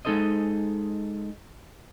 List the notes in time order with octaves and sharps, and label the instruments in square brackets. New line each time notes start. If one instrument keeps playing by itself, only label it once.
[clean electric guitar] G#3 D4 D#4 A4 C5 D#5